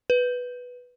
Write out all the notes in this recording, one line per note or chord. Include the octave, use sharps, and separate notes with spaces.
B4